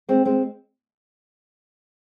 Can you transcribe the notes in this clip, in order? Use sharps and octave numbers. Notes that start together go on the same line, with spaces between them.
G#3 C4
G#3 C4